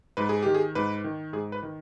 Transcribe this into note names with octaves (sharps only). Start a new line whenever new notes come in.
G#2 B4
G#4
D#3 G4
G#4
G#2 B4
D#3
G#2 G#4
B4
D#3